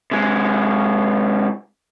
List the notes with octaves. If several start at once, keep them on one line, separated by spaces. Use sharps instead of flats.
C3 G#3